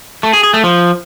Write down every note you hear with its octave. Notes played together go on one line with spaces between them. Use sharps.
A3
G#4
G#4
A3
F3